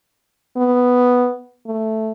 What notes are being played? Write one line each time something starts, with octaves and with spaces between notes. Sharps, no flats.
B3
A3